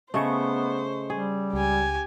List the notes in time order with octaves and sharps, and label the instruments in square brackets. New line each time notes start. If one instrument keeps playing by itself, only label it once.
[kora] C#3 A3 [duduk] B3 [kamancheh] C5 [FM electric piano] D#5 C#6
[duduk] G3 [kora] G#4
[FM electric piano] C#2 [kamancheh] G4 G#5